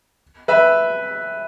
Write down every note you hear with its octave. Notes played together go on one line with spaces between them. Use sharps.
B4 E5